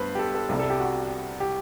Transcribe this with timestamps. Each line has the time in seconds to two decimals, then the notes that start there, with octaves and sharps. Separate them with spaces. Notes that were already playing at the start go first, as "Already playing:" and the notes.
Already playing: G2 B3 B4 C5
0.15 G4
0.19 A4
0.35 A4
0.49 C2 C3 G3 A4
0.59 A4
0.70 G4
0.80 F#4
1.40 G4